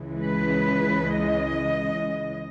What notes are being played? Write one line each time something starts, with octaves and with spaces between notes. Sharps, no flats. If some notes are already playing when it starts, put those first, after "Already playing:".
Already playing: C#2 C#3 E3 G#3
B4
D#5